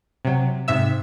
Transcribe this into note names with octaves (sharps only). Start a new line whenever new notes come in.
C3 F#3
G#2 C3 E5 E6